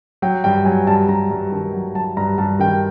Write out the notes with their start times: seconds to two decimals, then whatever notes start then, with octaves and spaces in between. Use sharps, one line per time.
0.22 F#3 G5
0.44 G2 G5
0.65 F#3 G#5
0.87 G2 A5
1.08 G2 A#5
1.31 G2
1.52 D#3 A5
1.73 F#3
1.95 F#3 A5
2.17 G2 A#5
2.38 G2 A5
2.60 D#3 G5